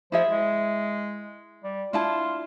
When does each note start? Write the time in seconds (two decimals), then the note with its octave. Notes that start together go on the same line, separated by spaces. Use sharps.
0.12 F3 E4 G#4 E5
0.29 G#3
1.64 G3
1.93 D4 E4 F4 A5